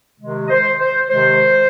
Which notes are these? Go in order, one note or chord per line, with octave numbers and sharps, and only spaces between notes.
C3 D#3 G#3
D#5
C5
C5
C3 D#3 G#3 C5